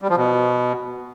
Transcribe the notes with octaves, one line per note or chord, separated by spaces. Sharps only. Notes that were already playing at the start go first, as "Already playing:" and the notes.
G3
F3
B2